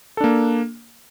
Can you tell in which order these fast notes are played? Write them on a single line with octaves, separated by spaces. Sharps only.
A4 D4 A#3